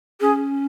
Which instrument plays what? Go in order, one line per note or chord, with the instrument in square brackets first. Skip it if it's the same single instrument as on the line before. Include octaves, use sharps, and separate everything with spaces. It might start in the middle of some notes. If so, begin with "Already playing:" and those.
[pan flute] C#4 [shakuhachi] G#4